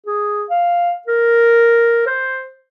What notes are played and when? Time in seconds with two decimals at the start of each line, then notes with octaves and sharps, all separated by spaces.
0.06 G#4
0.50 F5
1.07 A#4
2.06 C5